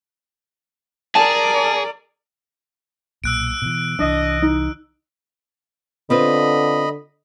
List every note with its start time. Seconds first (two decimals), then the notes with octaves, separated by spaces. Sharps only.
1.15 G#4 A#4 D5 G#5 A5
3.24 B1 A#2 E6 F#6 D7
3.62 B2 D#3 E3
3.99 C2 E3 D4 D#5
4.42 D#4
6.10 D3 C4 F4 B4 D#5 B5